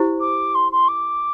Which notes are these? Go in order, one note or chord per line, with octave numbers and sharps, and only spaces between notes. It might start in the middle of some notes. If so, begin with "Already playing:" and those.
Already playing: E4 G4 C5
D6
C6
C6
D6